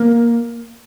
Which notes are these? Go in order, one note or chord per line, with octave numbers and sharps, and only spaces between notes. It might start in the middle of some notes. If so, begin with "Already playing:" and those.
Already playing: A#3